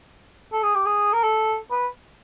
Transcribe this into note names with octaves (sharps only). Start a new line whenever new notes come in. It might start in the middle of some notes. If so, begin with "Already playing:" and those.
A4
G#4
G4
G#4
A#4
A4
B4